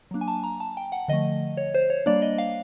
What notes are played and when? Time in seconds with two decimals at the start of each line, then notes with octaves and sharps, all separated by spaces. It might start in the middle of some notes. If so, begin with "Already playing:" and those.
0.11 F#3 A#3 D4
0.21 G#5
0.28 A5
0.44 A#5
0.60 A5
0.77 G5
0.92 F#5
1.08 D3 F3 A3 D#5
1.57 C#5
1.74 C5
1.90 C#5
2.06 G3 A#3 D4 D5
2.22 D#5
2.38 F5